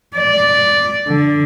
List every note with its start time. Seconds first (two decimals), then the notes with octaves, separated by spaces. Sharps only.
0.17 D5
1.08 D3